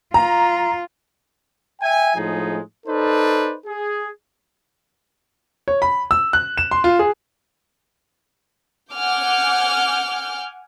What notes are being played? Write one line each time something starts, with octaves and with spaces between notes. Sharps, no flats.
F4 A#5
E5 G5 G#5
A2 F3 G#3 D#4 G#4
D#4 A4 B4 C5 D5
G#4
C#5
B5
E6
F#6
E7
C6
F4
G#4
F#5 G#5 D6 F6 G6